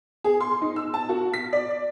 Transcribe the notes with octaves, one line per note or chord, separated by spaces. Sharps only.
G#4
C6
D#4
E6
A5
F#4
B6
D5